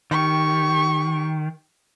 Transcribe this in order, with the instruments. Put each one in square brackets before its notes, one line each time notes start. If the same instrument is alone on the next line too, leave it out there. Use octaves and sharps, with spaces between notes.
[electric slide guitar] D#3 [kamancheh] G4 C#6